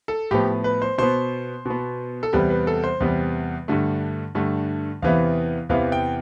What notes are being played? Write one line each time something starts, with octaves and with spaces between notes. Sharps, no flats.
A4
A2 F3 B3 G4
B4
C5
B2 B3 C5
B2 B3
A4
E2 C3 G3 B3 B4
B4
A4
C5
E2 C3 G3 B3
G2 D3 A3
G2 D3 A3
E2 C3 E3 B3 F5
E2 C3 E3 B3 F5
G5